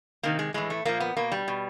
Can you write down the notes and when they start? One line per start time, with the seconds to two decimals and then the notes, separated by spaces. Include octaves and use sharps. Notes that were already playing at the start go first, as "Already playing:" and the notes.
0.23 C3 D#3 A#3
0.39 G#3
0.54 A2 E3 G#3
0.70 A3
0.85 A#2 F3 A#3
1.00 B3
1.17 B2 A#3
1.32 G3
1.48 B2